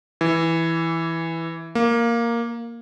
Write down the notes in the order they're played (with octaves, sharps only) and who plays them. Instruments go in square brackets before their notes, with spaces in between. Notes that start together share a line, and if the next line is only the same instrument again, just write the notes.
[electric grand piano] E3
A#3